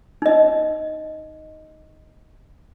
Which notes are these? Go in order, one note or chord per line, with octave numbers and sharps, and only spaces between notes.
D#4 D#5